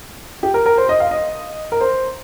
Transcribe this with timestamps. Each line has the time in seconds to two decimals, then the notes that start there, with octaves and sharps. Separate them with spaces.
0.43 G4
0.54 A#4
0.66 A#4
0.78 C5
0.89 D#5
1.00 F5
1.11 D#5
1.72 A#4
1.81 C5